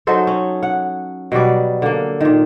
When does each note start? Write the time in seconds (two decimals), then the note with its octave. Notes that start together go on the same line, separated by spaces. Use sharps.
0.07 F#3 D#4 A4 C5
0.27 C#4
0.63 F#5
1.32 B2 F#3 G3 D5
1.82 D3 A#3
2.21 A#2 D#3